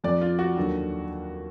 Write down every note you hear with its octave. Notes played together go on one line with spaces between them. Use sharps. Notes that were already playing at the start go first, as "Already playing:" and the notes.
F2 F3 D5
F4
F#4
D#2 D3 F#3